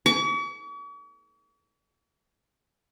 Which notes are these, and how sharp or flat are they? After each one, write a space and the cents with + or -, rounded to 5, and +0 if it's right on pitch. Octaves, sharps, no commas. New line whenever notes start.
C#6 +45